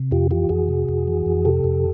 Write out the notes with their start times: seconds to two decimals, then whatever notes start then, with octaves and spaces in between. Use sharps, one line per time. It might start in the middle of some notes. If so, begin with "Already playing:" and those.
Already playing: C3
0.11 F2 F4 G4
0.31 E3 F4 G4
0.49 F2 F#4 G#4
0.69 C3
0.89 F2
1.08 E3
1.26 F2
1.45 C3 G4 A4
1.64 F2